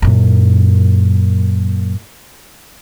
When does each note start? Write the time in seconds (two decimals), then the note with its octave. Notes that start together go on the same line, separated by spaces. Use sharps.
0.02 F#2 A#2